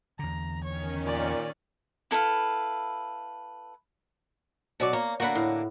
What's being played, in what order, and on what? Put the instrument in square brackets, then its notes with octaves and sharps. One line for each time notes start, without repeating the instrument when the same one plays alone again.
[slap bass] E2 D3 [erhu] A#5
[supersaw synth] D#3 C#4 [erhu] C#5
[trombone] A#2 [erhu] D5
[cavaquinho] E4 A4 B4 F5
[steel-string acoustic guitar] B2 F#3 D5
[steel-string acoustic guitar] A#3 [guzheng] C#5
[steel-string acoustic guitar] D3 A#3 [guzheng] F#4 F#5 B5
[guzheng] A2